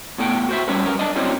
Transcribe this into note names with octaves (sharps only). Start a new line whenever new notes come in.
A2 B3 A4 G5
F#4 C5 E5
G3 C#4 A4 B4
F#2 A#4
D4 D5 D#5
F#3 A3 C4 C#4 E4 C5